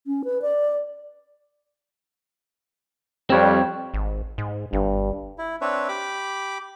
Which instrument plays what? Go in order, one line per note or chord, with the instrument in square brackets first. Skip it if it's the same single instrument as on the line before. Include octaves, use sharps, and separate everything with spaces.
[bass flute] C#4
B4
D5
[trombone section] F2 G3 [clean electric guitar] C4 C#5
[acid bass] G#1
G#2
[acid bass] G1 [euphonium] G2
[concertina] E4
C4 D4 B4 C#5 E5
G4 B5 D6